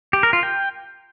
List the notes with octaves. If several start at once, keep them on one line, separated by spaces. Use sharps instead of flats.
G4
A#4
F4
G5